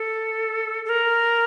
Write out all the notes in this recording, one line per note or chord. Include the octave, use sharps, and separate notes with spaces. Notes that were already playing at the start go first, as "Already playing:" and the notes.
Already playing: A4
A4
A#4